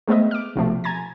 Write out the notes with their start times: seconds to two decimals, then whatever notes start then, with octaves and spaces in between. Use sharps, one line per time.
0.08 G#3 A3 B3 C4 D#5 E5
0.31 D6 F6
0.55 B1 C3 F3 A3
0.84 G#5 A#5 G#6 A6